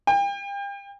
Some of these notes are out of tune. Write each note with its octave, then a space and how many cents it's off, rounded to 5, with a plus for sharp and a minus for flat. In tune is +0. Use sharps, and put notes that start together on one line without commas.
G5 +35